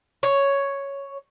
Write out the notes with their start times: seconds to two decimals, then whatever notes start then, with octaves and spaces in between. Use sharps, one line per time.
0.23 C#5